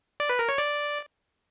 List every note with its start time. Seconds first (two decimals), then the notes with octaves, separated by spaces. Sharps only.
0.20 D5
0.29 B4
0.39 A#4
0.49 C#5
0.58 D5